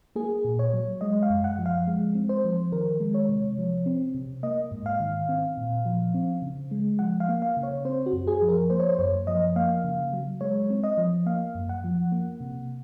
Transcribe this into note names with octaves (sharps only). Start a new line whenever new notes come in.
A#3 G#4
A#2
C#5
F#3
G#3 D#5
F5
F#2
F#5
F3
F5
G#3
C4
C5
F3
D#3 A#4
G#3
C#5
C3
F3
C4
C3
A#3 D#5
G#2
F5
D#3
C4
A#2
F3
C4
C#3
G#3
F3 F#5
F5
A#3
F5
C#3
C#5
C4 C5
F#4
F#2
G#4
F3
A#4
A#3 C5
C#5
C5
F#2 C#5
F3 D#5
A#3 F5
C#3
F#3
G#3 C#5
C4
D#5
F3
A#3 F5
F#2
F#5
F3
A#3
C3